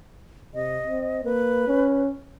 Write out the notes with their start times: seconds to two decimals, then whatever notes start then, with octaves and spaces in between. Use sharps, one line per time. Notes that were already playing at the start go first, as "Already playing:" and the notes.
0.54 C3 D#5
0.87 C4
1.24 A#3 B4
1.67 C#4